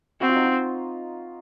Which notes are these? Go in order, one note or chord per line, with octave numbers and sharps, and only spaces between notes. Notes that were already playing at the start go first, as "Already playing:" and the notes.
C4 F#4
F4
D#4
F4